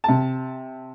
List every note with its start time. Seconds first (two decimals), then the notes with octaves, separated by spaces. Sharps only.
0.04 C3 A5